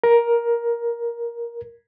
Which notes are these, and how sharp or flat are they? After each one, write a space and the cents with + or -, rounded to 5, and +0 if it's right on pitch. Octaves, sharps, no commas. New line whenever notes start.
A#4 +10